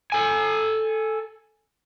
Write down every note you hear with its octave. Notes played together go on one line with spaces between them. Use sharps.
A4 G#5